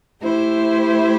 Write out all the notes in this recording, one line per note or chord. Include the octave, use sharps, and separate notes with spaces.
A3 E4 G4 C5 E5